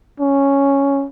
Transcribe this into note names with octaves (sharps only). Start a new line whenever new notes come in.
C#4